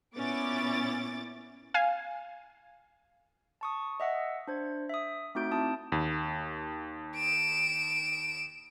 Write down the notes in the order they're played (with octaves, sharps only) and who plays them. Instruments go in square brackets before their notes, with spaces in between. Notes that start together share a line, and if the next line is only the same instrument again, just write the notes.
[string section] A#2 B3 C#4 E4 D6 A6
[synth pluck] F5 G#5
[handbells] A5 C#6 D#6
D#5 E5 F#5 E6
D4 C5 G#6
E5 D#6
A3 C4 D#4 F#4 G6 D7
C4 E4 A5 D#6
[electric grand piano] D#2
[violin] D7 E7